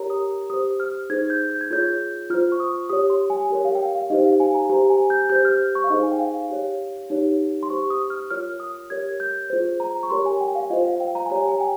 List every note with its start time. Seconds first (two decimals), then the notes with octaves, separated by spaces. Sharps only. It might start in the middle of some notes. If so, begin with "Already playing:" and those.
Already playing: G4 A#4 C#5 A#5
0.10 D#6
0.50 G4 C5 D#6
0.80 F6
1.10 D#4 G#4 C5 G#6
1.30 G6
1.50 G6
1.61 G#6
1.70 F4 G#4 C#5 G6
2.30 F4 C5 F6
2.52 C#6
2.60 D#6
2.90 G4 C#5 D#6
3.10 C6
3.30 G#5
3.50 G4 A#4 C#5
3.65 F5
3.75 G5
3.79 F5
3.95 F5
4.10 D#4 G4 C5 D#5
4.25 F5
4.40 G#5
4.54 A#5
4.69 G4 C5 A#5
4.90 G#5
5.10 G6
5.30 G4 C5 G6
5.45 F6
5.75 C#6
5.84 F5
5.90 D#4 G#4 C5 D#5
6.03 G#5
6.12 G5
6.20 F5
6.50 G4 C#5
7.10 D#4 G4 C#5
7.63 C6
7.70 G4 C5 C#6
7.90 D#6
8.10 F6
8.31 F4 A#4 C#5 F6
8.60 D#6
8.90 G4 A#4 C#5 G#6
9.20 G6
9.50 F4 G#4 C5
9.80 A#5
10.03 C#6
10.10 G4 A#4 C#5 C6
10.26 G#5
10.41 G5
10.55 F5
10.70 F4 C5 D#5
10.85 F5
11.00 G5
11.15 A#5
11.26 G#5
11.30 G4 C#5 A#5
11.48 G#5
11.60 G5